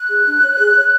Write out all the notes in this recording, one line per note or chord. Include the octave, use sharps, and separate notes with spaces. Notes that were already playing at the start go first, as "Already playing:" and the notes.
Already playing: F#6
G#4
D4
C#5
G#4
C#5